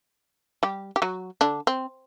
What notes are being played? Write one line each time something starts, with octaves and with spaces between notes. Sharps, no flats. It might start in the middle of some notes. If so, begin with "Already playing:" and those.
G3 G4
G4
F#3 F#4
D3 D4
C4